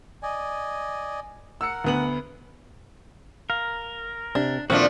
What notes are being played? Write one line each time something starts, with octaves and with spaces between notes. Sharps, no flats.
D5 D#5 G#5
A#4 F#5 E6 C#7
D2 B3 F#7
A#4 F5
C3 D4
A#2 D#3 F3 A3 C4 D4 F4 F#4